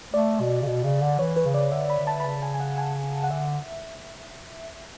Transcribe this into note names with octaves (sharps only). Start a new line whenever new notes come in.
A3 D5
B2
C#3
B2
C#3
D3
E3 C#5
B4
C#3
D5
D3 E5
B5
D3
A5
B5
C#3 A5
G#5
G#5
F#5
G#5
F#5
D3 E5